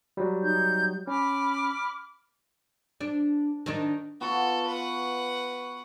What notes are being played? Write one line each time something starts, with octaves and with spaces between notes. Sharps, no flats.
F#3 G3
D#4 G6
C#4 B5 D6 F6
D4
D#3 D4 D#4
B3 F4 F#4 A4
B4 F#5